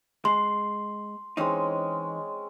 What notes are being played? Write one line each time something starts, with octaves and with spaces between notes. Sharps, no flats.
G#3 C6
E3 G#3 C4 C#4 D#4